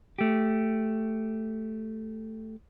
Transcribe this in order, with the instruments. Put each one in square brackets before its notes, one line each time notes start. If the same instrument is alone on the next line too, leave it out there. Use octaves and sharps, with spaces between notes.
[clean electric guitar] A3 G4